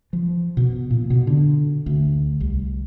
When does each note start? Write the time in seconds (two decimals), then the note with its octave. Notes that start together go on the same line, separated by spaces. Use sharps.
0.13 F3
0.57 B2
0.90 A#2
1.10 B2
1.27 D3
1.86 D2
2.40 C2